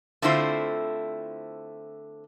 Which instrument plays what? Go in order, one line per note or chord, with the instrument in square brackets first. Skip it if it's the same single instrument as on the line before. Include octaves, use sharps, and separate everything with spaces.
[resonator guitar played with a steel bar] D3 A3 C4 E4 F4 C5